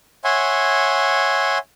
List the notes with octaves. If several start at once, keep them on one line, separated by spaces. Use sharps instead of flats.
C#5 E5 F#5 G#5 C6